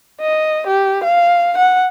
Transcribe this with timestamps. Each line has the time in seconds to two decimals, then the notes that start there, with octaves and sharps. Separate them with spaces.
0.21 D#5
0.67 G4
1.04 F5
1.58 F#5